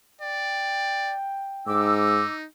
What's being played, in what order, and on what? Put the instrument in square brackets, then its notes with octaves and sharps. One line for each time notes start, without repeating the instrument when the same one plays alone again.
[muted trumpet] D5 [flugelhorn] G5
[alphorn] G#2 [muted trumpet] D#4 [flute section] D6 E6